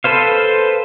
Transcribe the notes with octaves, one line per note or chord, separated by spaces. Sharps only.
A4 B4 C5 F5